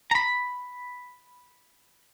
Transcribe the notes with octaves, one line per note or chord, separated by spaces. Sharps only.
A#5 B5